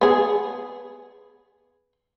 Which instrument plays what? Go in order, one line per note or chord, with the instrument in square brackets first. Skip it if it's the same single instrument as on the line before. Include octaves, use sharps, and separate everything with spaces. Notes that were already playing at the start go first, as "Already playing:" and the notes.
[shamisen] B3 G#4